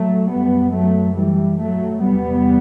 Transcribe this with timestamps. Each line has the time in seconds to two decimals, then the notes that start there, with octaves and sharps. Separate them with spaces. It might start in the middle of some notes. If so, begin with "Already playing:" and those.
Already playing: F#3 A3
0.28 F#2 G3 B3
0.72 F#3 A3
1.15 E3 G3
1.58 F#3 A3
2.01 E2 C3 G3 B3